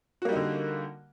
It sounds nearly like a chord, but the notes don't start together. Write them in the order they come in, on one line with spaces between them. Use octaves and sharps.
F#4 A#3 G3 D#4 D3